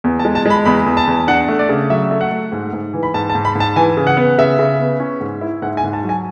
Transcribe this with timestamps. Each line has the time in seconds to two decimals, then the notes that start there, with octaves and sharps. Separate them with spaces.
0.04 E2
0.19 A5
0.25 G#3
0.35 A5
0.46 G#3 B5
0.65 E2 B5
0.86 E2
0.97 A5
1.07 E2
1.28 D4 F#5
1.49 A3
1.59 D5
1.69 C#3
1.90 F#3 E5
2.11 A3
2.21 F#5
2.31 A3
2.52 G#2
2.73 G#2
2.94 E3
3.03 B5
3.14 G#2 A5
3.30 A5
3.35 G#2
3.45 B5
3.55 G#2
3.60 A5
3.76 E3 G#5
3.97 C#3
4.07 F#5
4.17 B3
4.38 C#3 E5
4.59 C#3
4.80 B3
5.00 C#4
5.21 G#2
5.41 E4
5.62 G#2 F#5
5.77 G#5
5.83 G#2
5.93 A5
6.04 F#3
6.09 G#5